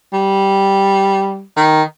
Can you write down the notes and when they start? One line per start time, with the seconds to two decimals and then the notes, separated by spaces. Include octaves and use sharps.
0.13 G3
1.57 D#3